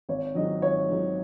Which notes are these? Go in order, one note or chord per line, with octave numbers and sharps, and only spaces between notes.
G#1 C#5
G#2 D#3 F#3 D#5
G#1 C#5
G#2 D#3 F#3